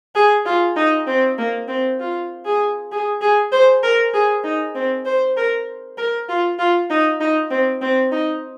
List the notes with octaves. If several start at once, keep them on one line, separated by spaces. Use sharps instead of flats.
G#4
F4
D#4
C4
A#3
C4
F4
G#4
G#4
G#4
C5
A#4
G#4
D#4
C4
C5
A#4
A#4
F4
F4
D#4
D#4
C4
C4
D#4